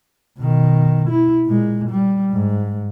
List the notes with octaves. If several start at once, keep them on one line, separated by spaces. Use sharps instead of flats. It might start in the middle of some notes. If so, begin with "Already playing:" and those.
B2 D#3
E4
A#2 G#3
G3
G#2